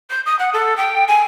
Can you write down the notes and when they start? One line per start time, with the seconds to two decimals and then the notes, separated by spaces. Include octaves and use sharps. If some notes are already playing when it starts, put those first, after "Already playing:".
0.10 G6
0.26 D#6
0.39 F#5
0.53 A4
0.77 G5
1.08 G#5